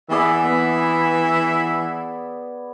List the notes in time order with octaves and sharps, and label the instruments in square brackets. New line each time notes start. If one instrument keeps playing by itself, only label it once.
[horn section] E3 E5 [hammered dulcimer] B3 G#4 D5
[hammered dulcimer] B3